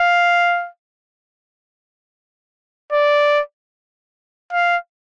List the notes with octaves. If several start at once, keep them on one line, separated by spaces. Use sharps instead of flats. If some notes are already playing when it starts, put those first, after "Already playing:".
Already playing: F5
D5
F5